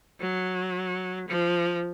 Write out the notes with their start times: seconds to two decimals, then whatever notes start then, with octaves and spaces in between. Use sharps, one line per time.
0.21 F#3
1.28 F3